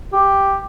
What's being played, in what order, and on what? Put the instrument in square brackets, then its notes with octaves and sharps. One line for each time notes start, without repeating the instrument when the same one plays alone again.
[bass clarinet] G4